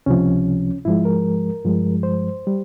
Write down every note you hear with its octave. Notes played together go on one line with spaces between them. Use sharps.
C#2 C3 F3 C#4
G#2 F3 G#3 E4
A#4
G2 F3 G#3
C5
G3